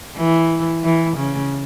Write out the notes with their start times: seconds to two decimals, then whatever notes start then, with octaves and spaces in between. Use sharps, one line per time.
0.17 E3
0.84 E3
1.17 C#3